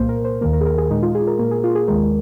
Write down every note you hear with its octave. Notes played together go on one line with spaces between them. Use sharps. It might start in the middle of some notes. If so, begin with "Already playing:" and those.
Already playing: C2 A#2 A#3 C5
A#4
C5
D#2 D#3 A#3 A#4
A#4
G#4
A#4
G#4
A#2 G#3 D#4
F4
G#4
A#4
A#2 A#3 A#4
G#4
F4
G#4
D#2 D#3 G#3 A#4